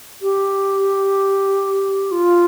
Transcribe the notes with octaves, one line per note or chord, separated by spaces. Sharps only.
G4
F4